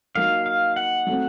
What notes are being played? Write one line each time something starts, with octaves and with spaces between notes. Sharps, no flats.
F#3 A#3 D#4 F5
F5
F#5
F#3 A3 C4